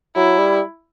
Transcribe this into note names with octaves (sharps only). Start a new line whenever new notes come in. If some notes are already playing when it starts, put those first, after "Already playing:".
F#3 E4
G3